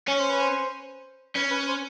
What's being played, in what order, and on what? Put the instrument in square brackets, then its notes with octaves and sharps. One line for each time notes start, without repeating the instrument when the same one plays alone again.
[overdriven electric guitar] C#4 [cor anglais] C#5
[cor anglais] C5
B4
C5
[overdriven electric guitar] C#4 [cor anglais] B4
[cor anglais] B4
C5